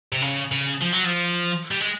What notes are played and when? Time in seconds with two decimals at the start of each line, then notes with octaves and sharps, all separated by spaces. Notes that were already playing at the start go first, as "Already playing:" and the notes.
0.13 C3
0.22 C#3
0.51 C#3
0.81 F3
0.92 F#3
1.04 F3
1.71 G3
1.81 G#3